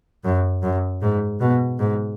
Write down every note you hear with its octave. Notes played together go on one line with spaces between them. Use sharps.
F#2
F#2
G#2
B2
G#2